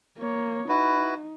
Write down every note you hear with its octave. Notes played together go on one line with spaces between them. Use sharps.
A#3 C#5
D#4 E4 F#4 B4